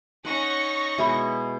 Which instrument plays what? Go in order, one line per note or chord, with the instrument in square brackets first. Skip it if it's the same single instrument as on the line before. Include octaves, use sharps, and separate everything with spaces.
[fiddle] C#4 D#4 [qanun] F#5 [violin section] C#6 A#6
[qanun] B2 G#3 E4 [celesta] E5 B5